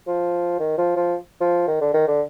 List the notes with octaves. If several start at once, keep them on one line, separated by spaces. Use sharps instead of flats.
F3
D#3
F3
F3
F3
D#3
D3
D#3
D3